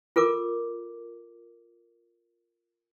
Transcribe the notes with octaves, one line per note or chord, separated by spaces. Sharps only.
F4 A4 A#4 D6